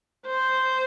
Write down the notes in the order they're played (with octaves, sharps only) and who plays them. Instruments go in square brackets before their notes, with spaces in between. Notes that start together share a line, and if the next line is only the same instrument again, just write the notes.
[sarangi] C5